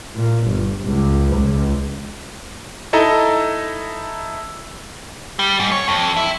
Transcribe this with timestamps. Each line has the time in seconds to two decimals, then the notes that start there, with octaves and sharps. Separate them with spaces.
0.16 A#2
0.49 G1
0.85 C#2
1.36 C#2
2.93 D#4 E4 A4 D#5 A#5
5.39 G3
5.60 G#2
5.71 C#5
5.88 F2
6.17 E4